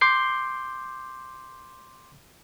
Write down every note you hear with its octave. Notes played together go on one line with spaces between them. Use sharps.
C6 D6 G6 C7